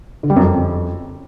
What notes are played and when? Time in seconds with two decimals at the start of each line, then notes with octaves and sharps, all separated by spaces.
0.23 D3
0.30 G3
0.36 F#2
0.43 F2